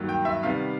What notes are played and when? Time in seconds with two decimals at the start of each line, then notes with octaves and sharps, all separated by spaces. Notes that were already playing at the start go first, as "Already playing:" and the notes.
Already playing: G2 D#3 F#3 A#3
0.09 G5
0.25 E5
0.43 C3 D#3 G3 B3 F5